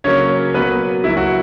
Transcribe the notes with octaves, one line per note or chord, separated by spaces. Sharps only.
C#3 F#3 A#3 C#4 C#5
B2 F#3 A#3 B3 B4
C#3 F#3 A#3 E4
F#4